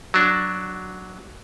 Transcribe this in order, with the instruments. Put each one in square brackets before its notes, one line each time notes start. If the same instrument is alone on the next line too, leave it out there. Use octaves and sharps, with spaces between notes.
[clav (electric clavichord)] F#3 D4